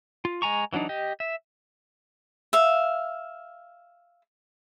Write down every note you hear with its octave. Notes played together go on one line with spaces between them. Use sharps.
F4
G#3 G#5 A#5 C#6
E3 F#3 C4 D4 D#4
G4 D#5
E5
E5 F5